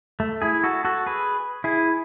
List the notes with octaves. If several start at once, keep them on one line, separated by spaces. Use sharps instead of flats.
A3
E4 G#4
F#4 A4
F#4 A4
G#4 B4
E4 G#4